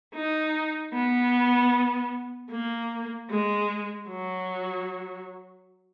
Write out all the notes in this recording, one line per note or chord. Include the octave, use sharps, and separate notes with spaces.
D#4
B3
A#3
G#3
F#3